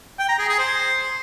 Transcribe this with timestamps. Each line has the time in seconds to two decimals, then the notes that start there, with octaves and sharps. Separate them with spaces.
0.19 G5
0.29 A#5
0.39 G#4
0.49 G#4
0.59 C5